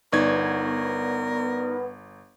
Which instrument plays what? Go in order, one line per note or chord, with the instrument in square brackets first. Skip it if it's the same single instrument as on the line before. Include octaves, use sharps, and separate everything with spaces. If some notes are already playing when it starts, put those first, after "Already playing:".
[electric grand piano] G1 G#6 [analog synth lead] B3 [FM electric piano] D#4 D5 C#6 [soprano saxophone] A#4